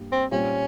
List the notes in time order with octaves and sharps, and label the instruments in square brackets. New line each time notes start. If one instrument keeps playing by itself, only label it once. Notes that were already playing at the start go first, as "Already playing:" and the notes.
Already playing: [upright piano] G2 G3 A#3
[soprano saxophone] C4
[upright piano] A#2 G3 C4 F4 [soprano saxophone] C#4